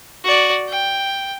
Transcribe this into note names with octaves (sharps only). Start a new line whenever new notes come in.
F#4 D5
G5